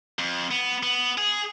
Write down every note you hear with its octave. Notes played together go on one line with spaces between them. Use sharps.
F2
B3
B3
G#4